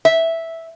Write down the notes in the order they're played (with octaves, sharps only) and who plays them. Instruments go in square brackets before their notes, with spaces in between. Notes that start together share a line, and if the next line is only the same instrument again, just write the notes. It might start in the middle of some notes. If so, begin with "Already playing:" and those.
[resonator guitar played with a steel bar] E5